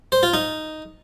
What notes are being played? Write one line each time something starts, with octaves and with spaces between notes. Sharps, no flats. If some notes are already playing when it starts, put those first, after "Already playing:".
C5
F4
D#4